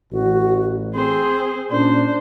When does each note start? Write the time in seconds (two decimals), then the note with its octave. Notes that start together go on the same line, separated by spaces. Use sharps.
0.12 A1 F#4
0.95 C4 G#4 C5
1.71 A#2 C#4 D4 C5 D5